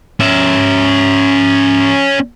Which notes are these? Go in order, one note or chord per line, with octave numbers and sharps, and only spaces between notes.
C#4 E5